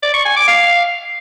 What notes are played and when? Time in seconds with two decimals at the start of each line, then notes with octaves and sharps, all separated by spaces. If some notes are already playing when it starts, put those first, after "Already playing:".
0.03 D5
0.14 C#6
0.25 G#5
0.36 D6
0.48 F5